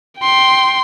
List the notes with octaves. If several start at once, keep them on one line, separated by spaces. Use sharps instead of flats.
G5 C6